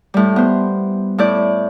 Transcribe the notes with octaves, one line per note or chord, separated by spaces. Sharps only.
A2 G3
B3 C5
A2 E4 D5 G6